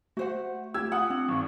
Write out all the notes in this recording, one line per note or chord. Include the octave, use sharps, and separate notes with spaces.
A3 F#4 C5 F#5
G4 E6 G#6
F4 F#5 D#6
C4 D4
G#1 G#2 C#6